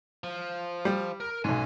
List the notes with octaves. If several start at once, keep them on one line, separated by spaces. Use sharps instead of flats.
F3
G3
A#4
B1 G#2 C#4 G#5